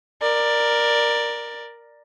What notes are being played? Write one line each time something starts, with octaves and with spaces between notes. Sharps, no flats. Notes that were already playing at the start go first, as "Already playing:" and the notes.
A#4 D5